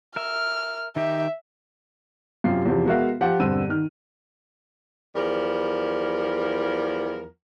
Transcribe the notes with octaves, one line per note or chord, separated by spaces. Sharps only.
A#4 E5 F6
D#3 D#4 G4 E5
F#2 C3 F4 G4 C7
E2 C3 F3
G#3 B3 F#4 A#4 E5 F5
F3 F4 G4 F#5
E1 G2 D3 C4 E6 D#7
D#3 F6
E2 F3 G3 A#4